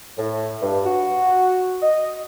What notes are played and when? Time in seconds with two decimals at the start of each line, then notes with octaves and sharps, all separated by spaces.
0.18 A2
0.62 G2
0.85 F#4
1.82 D#5